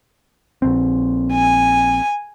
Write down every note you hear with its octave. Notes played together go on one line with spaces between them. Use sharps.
A#1 C4
G#5